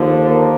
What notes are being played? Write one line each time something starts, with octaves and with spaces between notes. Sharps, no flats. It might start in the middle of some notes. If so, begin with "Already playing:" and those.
Already playing: D#2 D3 F3
A#3